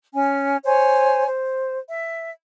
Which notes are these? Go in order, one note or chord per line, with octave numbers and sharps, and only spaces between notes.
C#4 G#5
C5 C#5 G#5
C5
E5